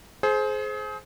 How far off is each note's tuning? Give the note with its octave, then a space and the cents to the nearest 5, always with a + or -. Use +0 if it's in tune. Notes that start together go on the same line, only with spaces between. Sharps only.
G#4 +35 C5 +0